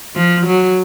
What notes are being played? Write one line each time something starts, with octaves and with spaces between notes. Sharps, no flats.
F3
F#3